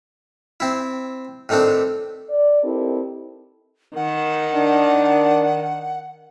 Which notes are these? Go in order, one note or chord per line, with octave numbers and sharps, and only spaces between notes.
C4 E4
A2 D#3 A3 C4 D4
D5
C4 D#4 E4 G4 A4 A#4
D#3 F#5
D4